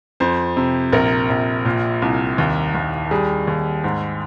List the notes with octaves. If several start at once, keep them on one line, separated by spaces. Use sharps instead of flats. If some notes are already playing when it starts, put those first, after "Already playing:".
F2 C5
C3
A#1 A#4
A#1
A#2
C2
D#2
D#2
G3 G#4
D#2
G#2